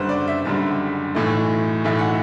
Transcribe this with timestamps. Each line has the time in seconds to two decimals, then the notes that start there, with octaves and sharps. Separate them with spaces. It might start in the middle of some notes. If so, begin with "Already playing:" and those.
Already playing: F#1 F#2 D3 G3 B4 C5
0.09 D5
0.28 E5
0.45 F#1 F#2 D3 G3
1.15 B1 A2 E3 A3
1.85 B1 A2 E3 A3 E5
1.99 F#5